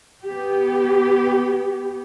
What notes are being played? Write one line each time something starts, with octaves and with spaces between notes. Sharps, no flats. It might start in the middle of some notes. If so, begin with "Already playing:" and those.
B3 G4